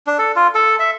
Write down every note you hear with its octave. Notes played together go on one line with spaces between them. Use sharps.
D4
A4
F4
A4
E5